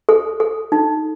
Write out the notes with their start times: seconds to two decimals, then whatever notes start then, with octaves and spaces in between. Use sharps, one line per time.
0.09 A4
0.40 A4
0.72 D#4